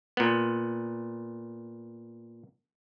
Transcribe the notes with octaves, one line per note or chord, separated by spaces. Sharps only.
A#2 B3